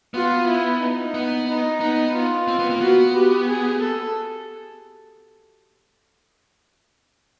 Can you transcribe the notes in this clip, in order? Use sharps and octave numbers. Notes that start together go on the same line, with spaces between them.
B3 F4
E4
D#4
B3
D#4
B3 D#4
F4
C4
B3
A#3
B3 F#4
G4
G#4
A4